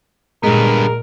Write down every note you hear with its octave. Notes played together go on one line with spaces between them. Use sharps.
G2 A#2 G#3 B3 A#4